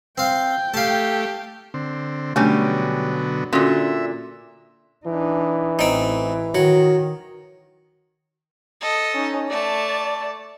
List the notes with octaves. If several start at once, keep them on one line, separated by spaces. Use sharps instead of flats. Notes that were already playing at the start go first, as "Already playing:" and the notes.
C4 F5 G5
A3 G4 F5 A5
D3 C4
B2 D3 F#3 G3 A3 C#4 D4
A#2 D3 C#4 F#4 E5
E3 D4 D#4
A1 C4 D#4
D#3 F#3
A4 D#5
C#4 D#4
A3 D5 A5